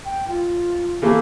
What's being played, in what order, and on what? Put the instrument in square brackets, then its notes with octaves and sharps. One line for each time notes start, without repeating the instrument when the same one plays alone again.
[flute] G5
F4
[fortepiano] E3 A3 A#3